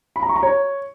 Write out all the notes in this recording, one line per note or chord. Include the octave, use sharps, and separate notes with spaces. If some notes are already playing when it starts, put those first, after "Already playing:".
B5
A#5
C#6
A#5
C#5